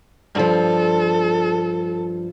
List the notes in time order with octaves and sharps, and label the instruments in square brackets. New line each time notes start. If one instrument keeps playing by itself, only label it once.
[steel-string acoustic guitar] G2 F3 [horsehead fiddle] A4